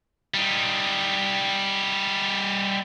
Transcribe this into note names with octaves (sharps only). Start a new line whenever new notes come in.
G3 D#4